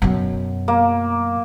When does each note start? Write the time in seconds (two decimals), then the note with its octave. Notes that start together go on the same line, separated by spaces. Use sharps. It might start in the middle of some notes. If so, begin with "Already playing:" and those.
0.02 F#2 B2
0.68 A#3